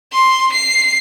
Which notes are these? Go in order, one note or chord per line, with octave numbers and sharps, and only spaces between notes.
C6
C7